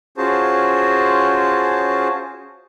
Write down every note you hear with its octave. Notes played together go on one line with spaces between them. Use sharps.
C#4 F4 F#4 G#4 C5 A5